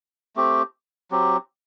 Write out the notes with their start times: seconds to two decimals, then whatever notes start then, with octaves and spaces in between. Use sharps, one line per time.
0.36 A3 C4 G4
1.11 F#3 C4 G4